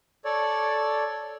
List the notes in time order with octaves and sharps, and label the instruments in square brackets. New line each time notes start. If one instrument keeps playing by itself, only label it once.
[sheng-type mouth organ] A4 C#5 D5